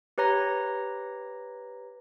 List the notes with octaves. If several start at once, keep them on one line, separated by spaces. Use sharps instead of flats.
G4 B4 C#5 A#5 A#6